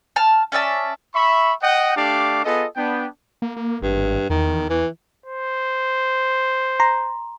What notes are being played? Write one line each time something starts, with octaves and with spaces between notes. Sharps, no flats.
A5 F6
C#4 D5 E5 A5
E5 B5 C#6
D#5 F#5 G5
A3 D4 G4 D5 F5 D6
B3 F4 G#4 A4 D#5
B3 D4 G5
A#3
A#3
G#1 G2
E2 D#3
E3
C5
A#5 C6